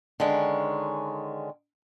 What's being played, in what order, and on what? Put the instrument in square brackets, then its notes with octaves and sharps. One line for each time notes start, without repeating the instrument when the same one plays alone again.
[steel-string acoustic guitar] D3 D#3 G#3 C#4